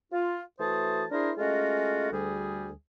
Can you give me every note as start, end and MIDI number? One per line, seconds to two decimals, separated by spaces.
0.12 0.42 65
0.60 1.05 52
0.60 1.05 57
0.60 1.05 66
0.60 1.05 72
0.60 1.05 81
0.60 1.05 87
1.12 1.32 62
1.12 1.32 64
1.12 1.32 68
1.12 1.32 70
1.12 1.32 72
1.38 2.09 56
1.38 2.09 57
1.38 2.09 61
1.38 2.09 65
1.38 2.09 66
1.38 2.09 75
2.13 2.71 38
2.13 2.71 55
2.13 2.71 68